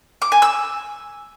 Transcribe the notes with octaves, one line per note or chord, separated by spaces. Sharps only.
D6
G#5
E6